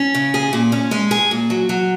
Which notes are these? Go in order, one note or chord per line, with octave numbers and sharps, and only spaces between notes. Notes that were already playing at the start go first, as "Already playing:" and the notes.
Already playing: C#4
C#3
G#4
A#2
C#4
G#3
G#4
A#2
F#3
F#3